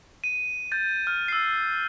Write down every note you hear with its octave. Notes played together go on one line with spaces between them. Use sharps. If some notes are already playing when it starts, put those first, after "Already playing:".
D#7
G6 A6
F6
E6 C7